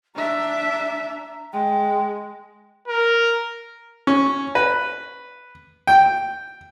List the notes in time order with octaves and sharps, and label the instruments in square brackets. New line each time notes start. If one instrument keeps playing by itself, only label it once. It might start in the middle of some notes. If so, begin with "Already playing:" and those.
[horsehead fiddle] D4 E5 [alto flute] A#5
[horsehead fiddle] G#3 [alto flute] G5
[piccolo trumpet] A#4
[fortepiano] C#4
B4
G5